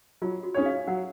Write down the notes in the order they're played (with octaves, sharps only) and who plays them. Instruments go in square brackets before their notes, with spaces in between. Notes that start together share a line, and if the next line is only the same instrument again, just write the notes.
[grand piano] F#3 [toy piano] F4
[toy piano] F#4
[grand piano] C#4 G#4 C#5
[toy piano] F5
[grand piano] F#3 [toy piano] F#5